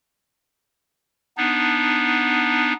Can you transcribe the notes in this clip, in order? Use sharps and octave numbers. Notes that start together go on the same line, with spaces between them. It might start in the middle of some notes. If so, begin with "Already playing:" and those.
B3 D4 D#4